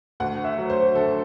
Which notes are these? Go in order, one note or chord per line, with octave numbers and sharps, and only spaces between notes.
D2 F#5
E5
F#3
C5
D3 A4